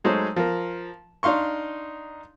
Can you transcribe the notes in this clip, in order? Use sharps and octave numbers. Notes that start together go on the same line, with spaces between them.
F#3 G#3 A3 D#4 C5 C#5
F3 A#4
D4 D#4 F5 C6 C#6